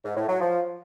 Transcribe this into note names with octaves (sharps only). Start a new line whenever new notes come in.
G#2
A2
F#3
F3